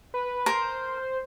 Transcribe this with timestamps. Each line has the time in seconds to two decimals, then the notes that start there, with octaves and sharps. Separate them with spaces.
0.14 B4
0.46 A#4 C5